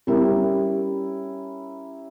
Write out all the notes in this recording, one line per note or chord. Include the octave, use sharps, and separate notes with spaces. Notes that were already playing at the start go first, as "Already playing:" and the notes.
G3 C#4 E4 A#4